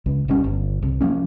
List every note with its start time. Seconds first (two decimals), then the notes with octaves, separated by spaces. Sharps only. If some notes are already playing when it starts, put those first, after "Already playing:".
0.06 C#2
0.28 D#1 C2 G3 C#4
0.44 G1
0.83 C2
1.01 F3 F#3 A#3 C#4